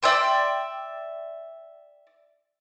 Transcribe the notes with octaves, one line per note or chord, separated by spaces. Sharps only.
D5 E5 G5 C6